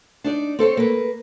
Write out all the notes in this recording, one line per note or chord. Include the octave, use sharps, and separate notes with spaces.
D4 D#4 D5
C4 A4 C5 C#5
A#3 B4